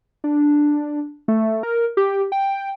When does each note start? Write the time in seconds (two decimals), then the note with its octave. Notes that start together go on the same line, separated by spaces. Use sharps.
0.24 D4
1.28 A3
1.63 A#4
1.97 G4
2.32 G5